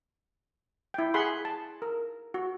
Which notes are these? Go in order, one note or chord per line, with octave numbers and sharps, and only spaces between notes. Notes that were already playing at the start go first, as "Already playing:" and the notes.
E4 G5
G#4 F#5 B5 C6
A5
A#4
F#4